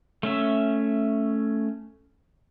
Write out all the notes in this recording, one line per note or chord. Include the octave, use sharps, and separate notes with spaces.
A3 C#4 E5